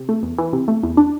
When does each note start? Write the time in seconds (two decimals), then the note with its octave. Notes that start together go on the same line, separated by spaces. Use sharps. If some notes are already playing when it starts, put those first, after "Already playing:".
Already playing: C3
0.09 A3
0.23 E2
0.38 E3
0.53 C3
0.68 A3
0.83 E2
0.97 D4